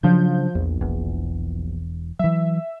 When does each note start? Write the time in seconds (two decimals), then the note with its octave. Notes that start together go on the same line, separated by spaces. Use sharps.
0.03 C#3 F3 F#3 D4 G6
0.55 A#1 E2
0.81 E1 E2
2.19 E3 F#3 E5